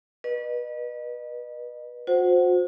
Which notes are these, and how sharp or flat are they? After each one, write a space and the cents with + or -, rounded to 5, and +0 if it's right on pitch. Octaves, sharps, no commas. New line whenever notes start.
B4 -30 D#5 -35
F#4 -45 C5 +0 F#5 +10